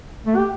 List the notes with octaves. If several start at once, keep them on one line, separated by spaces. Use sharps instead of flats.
A3
G4